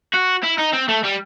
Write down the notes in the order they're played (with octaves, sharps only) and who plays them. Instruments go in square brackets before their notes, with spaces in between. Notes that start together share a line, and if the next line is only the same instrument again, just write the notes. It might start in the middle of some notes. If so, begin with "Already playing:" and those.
[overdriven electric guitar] F#4
E4
D#4
C4
A3
G3